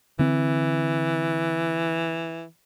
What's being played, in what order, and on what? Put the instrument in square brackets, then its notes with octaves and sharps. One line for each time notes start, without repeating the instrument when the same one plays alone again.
[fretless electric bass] D3 C4 [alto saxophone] E3